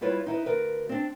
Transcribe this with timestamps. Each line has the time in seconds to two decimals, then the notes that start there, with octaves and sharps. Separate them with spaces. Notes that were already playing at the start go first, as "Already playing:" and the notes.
0.01 G3 E4 F4 B4 C#5
0.26 D#4 E4 B4
0.46 D2 A#4 B4
0.89 C4 D4